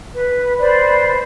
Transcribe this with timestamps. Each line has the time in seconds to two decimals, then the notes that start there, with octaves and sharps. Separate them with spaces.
0.14 B4
0.58 B4 C5 D5 B5